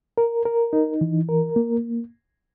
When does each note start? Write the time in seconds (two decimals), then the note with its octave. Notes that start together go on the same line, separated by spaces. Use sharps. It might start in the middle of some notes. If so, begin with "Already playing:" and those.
0.18 A#4
0.46 A#4
0.73 D#4
1.01 E3
1.29 A#4
1.56 A#3